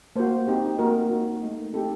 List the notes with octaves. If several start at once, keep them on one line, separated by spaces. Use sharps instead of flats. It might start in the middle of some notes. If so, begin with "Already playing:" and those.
A#3 F#4 C5
C4 D#4 G4
A#3 F#4 A#4
A#3 D#4 F#4
A3 D#4 F#4
C4 D#4 G4 A4